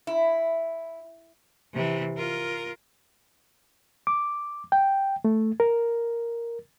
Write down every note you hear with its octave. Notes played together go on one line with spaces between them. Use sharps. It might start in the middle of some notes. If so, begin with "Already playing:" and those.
E4
C3 E3
F4 A#4
D6
G5
A3
A#4